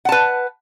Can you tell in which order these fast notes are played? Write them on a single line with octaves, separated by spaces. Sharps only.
F#5 A5 B4